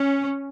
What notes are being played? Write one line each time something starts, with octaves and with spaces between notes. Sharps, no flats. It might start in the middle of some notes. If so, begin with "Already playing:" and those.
Already playing: C#4